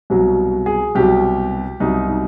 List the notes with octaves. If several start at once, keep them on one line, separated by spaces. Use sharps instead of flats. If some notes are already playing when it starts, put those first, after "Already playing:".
C2 B2 F#3
G#4
C2 B2 F#3 G4
C2 B2 F#3 D#4
D#4